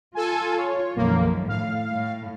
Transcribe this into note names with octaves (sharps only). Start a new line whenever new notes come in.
F4 A4 G#5
C#5
B1 F#2 D#3 F3 A#3
A2 F5
A2